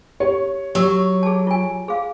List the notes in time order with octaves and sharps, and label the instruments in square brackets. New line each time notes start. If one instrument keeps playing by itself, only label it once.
[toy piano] G4 [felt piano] C#5
[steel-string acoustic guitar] F#3 [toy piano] G4 E6
[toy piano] G#4 A5
F4 G#5
G#4 F5